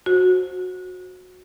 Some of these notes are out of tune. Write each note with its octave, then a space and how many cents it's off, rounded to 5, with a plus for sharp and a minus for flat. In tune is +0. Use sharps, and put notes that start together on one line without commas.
F#4 -15 C5 +15